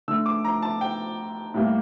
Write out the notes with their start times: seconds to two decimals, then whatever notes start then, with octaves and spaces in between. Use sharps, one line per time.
0.08 D3 A3 E6
0.26 D6
0.45 A#5
0.62 A5
0.81 G5
1.54 A2 G3 A#3